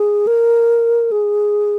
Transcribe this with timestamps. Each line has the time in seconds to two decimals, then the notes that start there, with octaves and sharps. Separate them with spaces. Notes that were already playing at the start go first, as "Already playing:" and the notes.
Already playing: G#4
0.27 A#4
1.12 G#4